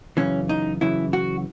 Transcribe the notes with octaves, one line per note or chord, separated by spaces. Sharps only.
F#2 C#3 E3 C#4
D#4
F#2 C#3 E3 E4
F#4